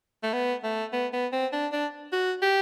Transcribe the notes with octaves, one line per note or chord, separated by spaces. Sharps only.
A3
B3
A3
B3
B3
C4
D4
D4
F#4
G4